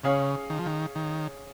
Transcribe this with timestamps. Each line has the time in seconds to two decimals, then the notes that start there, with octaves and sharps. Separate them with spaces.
0.04 C#3 C#4 G#4 C#5 F5
0.50 D#3
0.59 F3
0.66 D#3
0.96 D#3